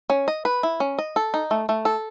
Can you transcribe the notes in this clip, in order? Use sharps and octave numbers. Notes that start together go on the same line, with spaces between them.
C#4
D#5
B4
E4
C#4
D#5
A4
D#4
A3
A3
A4